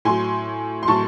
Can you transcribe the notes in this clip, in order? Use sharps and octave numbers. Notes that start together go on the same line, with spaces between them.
A2 F#3 G#5 C6
C6
A2 F#3 A5 C#6